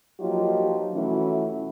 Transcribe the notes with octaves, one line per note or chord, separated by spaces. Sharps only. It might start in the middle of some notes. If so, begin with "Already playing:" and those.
F3 F#3 A#3 D#4 F4 G4
B2 E3 A3 C#4 E4 F#4